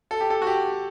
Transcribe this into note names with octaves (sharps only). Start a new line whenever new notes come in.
A4
G4
A4
F#4
G4